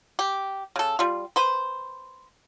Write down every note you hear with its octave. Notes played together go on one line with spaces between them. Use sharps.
G4
C#3 A4
G3 F4
B4 C5